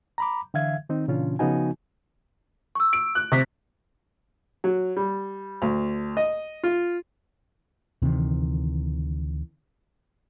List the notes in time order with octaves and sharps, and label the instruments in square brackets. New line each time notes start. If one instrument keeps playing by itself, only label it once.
[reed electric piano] A#5 B5 D6
D3 E3 E5 F5 G#6
D#3 C4 D#4
A#2 C#3 E3 C#4 D4 F4
C#3 F3 B3 D#4 F#4 G#5
[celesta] C#6 E6
[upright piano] D7
F#6
[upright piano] C3 [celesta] C#6 B6
[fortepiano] F#3
G3
D2
D#5
F4
[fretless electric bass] D2 C3 D#3 E3